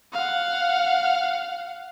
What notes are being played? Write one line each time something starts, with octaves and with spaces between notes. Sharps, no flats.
F5 F#5